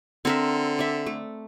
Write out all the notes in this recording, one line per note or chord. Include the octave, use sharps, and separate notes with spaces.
D3 C4 A#4 E5
D5 E5
A3